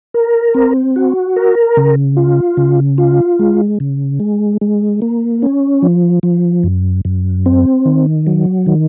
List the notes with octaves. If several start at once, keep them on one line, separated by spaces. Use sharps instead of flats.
A#4
C4
F#4
A#4
C#3
F4
C#3
F4
G#3
C#3
G#3
G#3
A#3
C#4
F3
F3
F#2
F#2
C4
D#3
F#3
D#3